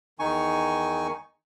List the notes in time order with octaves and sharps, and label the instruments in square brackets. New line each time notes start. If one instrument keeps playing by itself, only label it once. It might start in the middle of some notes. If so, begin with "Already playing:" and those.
[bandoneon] E2 D#3 D#4 G#5 C#6